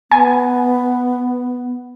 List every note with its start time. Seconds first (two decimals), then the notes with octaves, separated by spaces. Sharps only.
0.11 B3 G#5